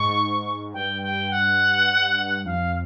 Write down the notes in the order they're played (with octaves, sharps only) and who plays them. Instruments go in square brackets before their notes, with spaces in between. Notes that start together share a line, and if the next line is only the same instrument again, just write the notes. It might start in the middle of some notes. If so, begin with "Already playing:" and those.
Already playing: [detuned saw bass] G#2 [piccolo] C#6
[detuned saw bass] G2 [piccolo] G5
[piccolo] G5
F#5
[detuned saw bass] F2 [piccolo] F5